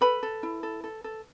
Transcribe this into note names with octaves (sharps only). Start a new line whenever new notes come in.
A4 B4 B5
A4
E4
A4
A4
A4